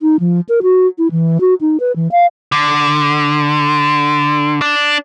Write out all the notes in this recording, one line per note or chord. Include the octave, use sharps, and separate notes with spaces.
D#4
F3
A#4
F#4
E4
E3
F#4
D#4
B4
E3
F5
D3
D4